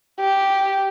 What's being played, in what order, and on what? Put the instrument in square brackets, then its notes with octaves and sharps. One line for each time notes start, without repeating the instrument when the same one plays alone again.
[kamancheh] G4